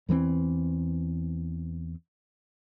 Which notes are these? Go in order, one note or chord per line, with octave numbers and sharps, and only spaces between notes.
E2 E3 F3 C4